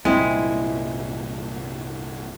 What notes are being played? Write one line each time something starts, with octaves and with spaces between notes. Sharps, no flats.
C2 G2 A#2 G#3 C4 E4